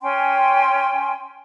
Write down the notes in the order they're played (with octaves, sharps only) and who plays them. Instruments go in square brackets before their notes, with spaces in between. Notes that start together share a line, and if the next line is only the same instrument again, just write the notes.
[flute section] C#4 G5 G#5 C6